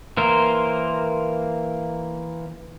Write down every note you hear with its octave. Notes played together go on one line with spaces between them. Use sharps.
E3 A#3 A#4 C5